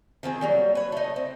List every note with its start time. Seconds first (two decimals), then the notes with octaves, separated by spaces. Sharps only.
0.23 D#3 F3 C4 G#4
0.41 F#3 G3 A#3
0.75 B4 C#5
0.92 A3 D#4
1.16 C4